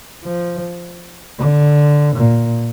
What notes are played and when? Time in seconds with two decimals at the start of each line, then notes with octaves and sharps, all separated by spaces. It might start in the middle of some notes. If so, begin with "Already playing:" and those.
0.23 F3
1.38 D3
2.15 A#2